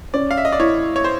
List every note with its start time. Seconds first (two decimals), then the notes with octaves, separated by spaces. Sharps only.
0.14 C#4 D5
0.31 F5
0.37 E5
0.45 D#5
0.52 D5
0.59 E4 C#5
0.96 C#5
1.04 C5